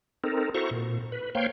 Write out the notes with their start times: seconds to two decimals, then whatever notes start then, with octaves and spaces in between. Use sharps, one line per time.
0.24 C4 D#4 A4 A#4
0.55 E4 F#4 A4 C5 A#5 C#6
0.71 A#2
1.12 B4
1.35 A#3 C5 C#5 F5 G5